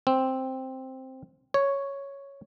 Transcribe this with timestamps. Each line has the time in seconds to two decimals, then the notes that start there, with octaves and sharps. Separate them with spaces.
0.07 C4
1.54 C#5